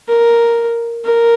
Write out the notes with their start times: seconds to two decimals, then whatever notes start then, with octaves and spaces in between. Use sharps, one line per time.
0.08 A#4
1.05 A#4